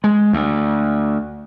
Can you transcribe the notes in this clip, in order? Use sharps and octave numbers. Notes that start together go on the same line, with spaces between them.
G#3
D2